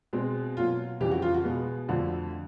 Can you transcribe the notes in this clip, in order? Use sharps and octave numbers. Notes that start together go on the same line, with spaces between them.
B2 G#3 C4
B2 F#3 A#3 F4
F2 C#3 E3 G3 G4
F#4
F4
F#4
B2 G#3 B3
F2 D3 F3 A3 F#4